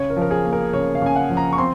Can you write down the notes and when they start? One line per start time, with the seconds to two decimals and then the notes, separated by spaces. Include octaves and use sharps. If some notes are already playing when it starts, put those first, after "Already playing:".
Already playing: C#3 C#5
0.10 A#4
0.16 F3
0.21 A#4
0.31 G#4
0.45 A#3
0.53 A#4
0.73 C#3 C#5
0.95 F5
1.02 C#3 G#5
1.16 F#5
1.30 F3
1.37 A#5
1.53 C#6
1.58 C4 C6